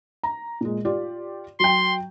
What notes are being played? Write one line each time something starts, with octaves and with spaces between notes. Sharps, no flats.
A#5
A#2 G#3
F4 G4 D5
F#3 G5 C6